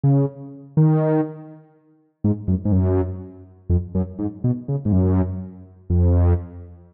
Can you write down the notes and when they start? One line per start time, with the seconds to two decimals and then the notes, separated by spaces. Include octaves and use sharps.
0.04 C#3
0.77 D#3
2.24 G#2
2.48 F#2
2.65 G#2
2.72 F#2
3.70 F2
3.95 F#2
4.19 G#2
4.44 B2
4.68 C#3
4.85 G#2
4.92 F#2
5.90 F2